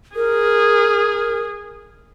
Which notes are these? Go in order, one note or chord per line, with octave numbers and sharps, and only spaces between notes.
G#4 A#4